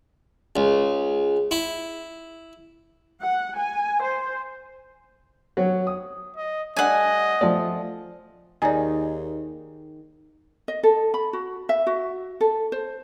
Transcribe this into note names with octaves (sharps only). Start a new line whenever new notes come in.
C#2
E4
F#5
G#5
C5
F#3 C#5
D#6
D#5
G3 A3 D4 D#5 F#5 G#5
F3 A3 D5
D#2 D#3 D#4 G#4 D5 G#5
D#5
A4
B5
F#4
E5
F#4
A4
C5